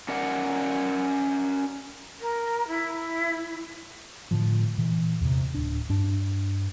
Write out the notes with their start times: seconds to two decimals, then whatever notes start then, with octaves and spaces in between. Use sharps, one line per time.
0.09 C#4 A#4 D5 F#5
2.20 A#4
2.67 E4
4.31 A2 D3 F3
4.78 A#2 E3
5.21 E2 C3
5.53 D1 D4
5.89 G2 D4